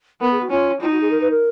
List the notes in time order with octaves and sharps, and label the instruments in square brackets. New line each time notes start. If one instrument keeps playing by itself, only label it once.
[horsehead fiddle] B3 [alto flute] A#4
[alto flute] G#4
F#4
[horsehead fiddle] C#4 [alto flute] F4
[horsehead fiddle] D#4 [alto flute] F4
[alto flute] F#4
G#4
A#4
B4
A#4